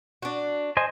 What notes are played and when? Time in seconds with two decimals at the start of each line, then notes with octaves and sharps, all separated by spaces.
0.22 D4 F#4
0.77 C5 D#5 G#5